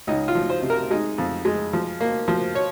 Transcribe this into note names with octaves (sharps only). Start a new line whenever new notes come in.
C#2 D#4
F4
F3
C5
C3
A#4
G#3 D#4
F2
G#3
F3
A#3
F3
C#5